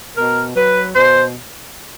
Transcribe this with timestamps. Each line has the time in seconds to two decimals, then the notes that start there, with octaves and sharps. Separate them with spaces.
0.17 B2 A#4
0.56 F#3 B4
0.95 B2 C5